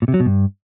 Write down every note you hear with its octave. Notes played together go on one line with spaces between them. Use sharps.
A#2
C3
F#3
B2
G2